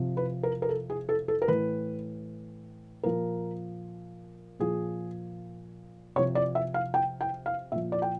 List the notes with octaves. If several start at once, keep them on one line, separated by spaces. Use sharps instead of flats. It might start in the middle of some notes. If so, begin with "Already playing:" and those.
Already playing: C3 F3
B4
A#4
A#4
A4
G#4
A4
A4
A#4
A2 E3 B4
A#2 F3 A#4
A#2 F3 G#4
C3 F3 C#5
D5
E5
F5
G5
G5
F5
A#2 F3 E5
D5
G5